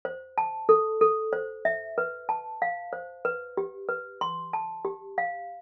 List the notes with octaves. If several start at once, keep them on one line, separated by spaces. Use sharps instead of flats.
C5
A5
A4
A4
C5
E5
B4
A5
F5
C5
B4
G4
B4
C6
A5
G4
F5